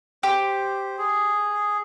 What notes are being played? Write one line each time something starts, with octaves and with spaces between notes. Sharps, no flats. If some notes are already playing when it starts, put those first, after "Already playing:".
G4 C5
G#4